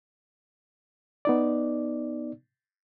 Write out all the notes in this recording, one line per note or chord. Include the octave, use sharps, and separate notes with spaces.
B3 D#4 D5